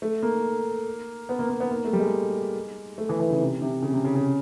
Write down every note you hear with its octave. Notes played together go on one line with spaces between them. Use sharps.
A3
A#3
B3
A#3
A#3
B3
A#3
A3
G3
G#3
A3
E3
E3
C#3
C3
C3
C#3
C3
C#3
C#3